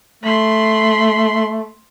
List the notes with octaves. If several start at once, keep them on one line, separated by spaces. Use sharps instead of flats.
A3 B5 C6